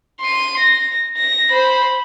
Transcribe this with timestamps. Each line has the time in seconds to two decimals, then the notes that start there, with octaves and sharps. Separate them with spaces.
0.21 C6 D#7
0.59 A#6
1.17 A#6
1.50 C5 B5